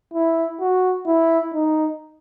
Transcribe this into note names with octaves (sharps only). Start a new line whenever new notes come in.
E4
F#4
E4
D#4